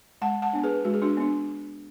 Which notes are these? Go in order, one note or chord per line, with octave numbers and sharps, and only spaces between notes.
G#3 F#5 A5
F#5 A5
B3 D4
G#4 B4
G#3 F#4
G#4
D4 F#4
B3 D4